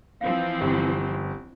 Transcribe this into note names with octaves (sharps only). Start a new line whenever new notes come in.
E3 F3 C4 F5
G1 G4